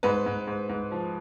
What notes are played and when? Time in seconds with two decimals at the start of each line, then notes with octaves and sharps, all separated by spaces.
0.03 G#2 B4
0.26 G#2
0.47 G#2
0.69 G#2
0.91 F3